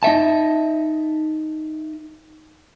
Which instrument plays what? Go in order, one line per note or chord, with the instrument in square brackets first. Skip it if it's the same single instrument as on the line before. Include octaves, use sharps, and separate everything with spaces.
[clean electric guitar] D#4 D#5 E5 A5